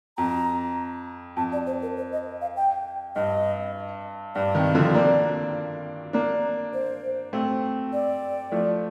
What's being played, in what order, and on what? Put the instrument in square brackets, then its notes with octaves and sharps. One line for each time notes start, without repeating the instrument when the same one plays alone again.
[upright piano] F2 [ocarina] A#5
[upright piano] F2 [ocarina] A5
[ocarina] D5
C5
A#4
C5
D#5
F5
G5
[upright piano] G2 [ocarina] D#5
[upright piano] G2 [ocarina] D5
[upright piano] C3 D#3
D3 F3
A#3 D4
A#3 D4
[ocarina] C5
[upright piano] A3 C4
[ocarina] D5
[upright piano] F3 A3